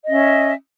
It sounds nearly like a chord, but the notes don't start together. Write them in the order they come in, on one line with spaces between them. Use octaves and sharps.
D#5 C#4 E5